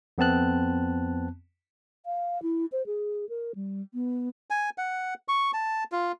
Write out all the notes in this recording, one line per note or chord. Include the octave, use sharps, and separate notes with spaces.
F2 B3 C4 A5 F#6
F5
E4
C5
G#4
A#4
G3
B3
G#5
F#5
C#6
A5
F4